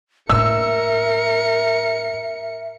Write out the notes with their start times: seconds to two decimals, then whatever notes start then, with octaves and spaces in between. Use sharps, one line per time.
0.30 A2 A#3 A#4 E5 E6 C#7